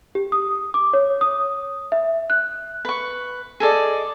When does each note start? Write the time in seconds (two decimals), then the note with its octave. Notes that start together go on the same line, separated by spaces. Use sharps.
0.15 G4
0.32 D#6
0.74 D6
0.93 C#5
1.21 D#6
1.92 E5
2.30 F#6
2.85 B4 C#6
3.60 G#4 A4 D5 D#5